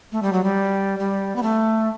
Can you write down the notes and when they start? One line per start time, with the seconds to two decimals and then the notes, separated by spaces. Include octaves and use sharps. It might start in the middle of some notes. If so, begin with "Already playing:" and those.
0.12 A3
0.23 G3
0.33 F#3
0.44 G3
0.99 G3
1.36 B3
1.43 A3